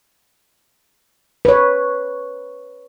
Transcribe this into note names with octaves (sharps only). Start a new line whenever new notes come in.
B4 C#5